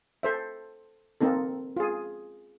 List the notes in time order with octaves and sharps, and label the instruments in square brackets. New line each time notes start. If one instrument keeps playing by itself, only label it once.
[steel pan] A4 C5 E5
A#3 C4 D#4 A4
F4 G#4